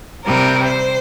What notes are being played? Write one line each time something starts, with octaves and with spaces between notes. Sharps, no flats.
C3 G3 A#4
C5